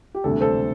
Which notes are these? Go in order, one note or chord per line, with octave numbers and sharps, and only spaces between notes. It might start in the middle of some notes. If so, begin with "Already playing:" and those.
G4
E1 D2 C3 G3 D4 A4
A4 C5